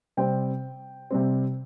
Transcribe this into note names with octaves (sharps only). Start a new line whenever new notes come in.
C3 G3 C4 G5
C3 G3 C4